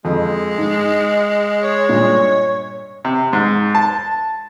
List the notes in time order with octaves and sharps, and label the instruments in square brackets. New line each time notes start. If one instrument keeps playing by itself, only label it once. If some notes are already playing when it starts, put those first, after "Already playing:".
[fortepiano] F2 [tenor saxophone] G#3
[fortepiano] G#2
[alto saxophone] C#5
[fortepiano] G2 A#2
C3
G#2
A5